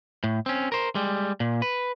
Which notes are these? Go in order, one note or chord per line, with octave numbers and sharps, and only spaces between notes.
A2
C4 C#4
A#4 C5
G3 G#3
A#2
B4